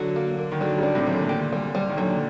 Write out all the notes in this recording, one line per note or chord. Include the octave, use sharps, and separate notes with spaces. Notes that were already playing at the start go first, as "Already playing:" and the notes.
Already playing: D3 F#3 F#4
A#3
A#3
D#3
D3 F#3 D4
D#3 G3
D4
A2 C3
F#3
A#2 D3
G4
G3
G3
D#3
A#2 D3 F#3